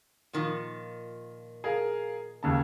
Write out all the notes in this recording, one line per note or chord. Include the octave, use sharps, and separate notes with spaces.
A#2 D#3 F3
G#4 A#4 F5
D#2 C#3 A5